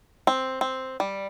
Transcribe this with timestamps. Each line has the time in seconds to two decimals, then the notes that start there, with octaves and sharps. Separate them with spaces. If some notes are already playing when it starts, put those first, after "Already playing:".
0.27 C4
0.61 C4
1.00 G3